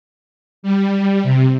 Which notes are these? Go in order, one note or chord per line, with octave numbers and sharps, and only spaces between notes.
G3
C3